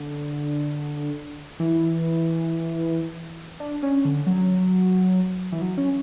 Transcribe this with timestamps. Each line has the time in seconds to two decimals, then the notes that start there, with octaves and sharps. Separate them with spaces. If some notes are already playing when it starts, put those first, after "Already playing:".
Already playing: D3
1.60 E3
3.60 D4
3.83 C#4
4.05 D3
4.27 F#3
5.52 E3
5.61 F#3
5.78 C#4